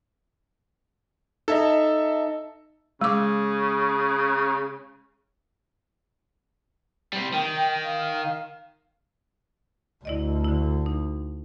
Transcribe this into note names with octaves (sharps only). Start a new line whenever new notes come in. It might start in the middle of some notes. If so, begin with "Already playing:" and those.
D#4 A4 D#5 E5
C#3 G#3 D6
G3 C4
D#3 G5
F5
D2 E4 D5 D#5
D3 E4
D#4